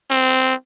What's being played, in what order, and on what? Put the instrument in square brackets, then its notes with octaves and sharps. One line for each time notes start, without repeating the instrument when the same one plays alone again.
[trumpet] C4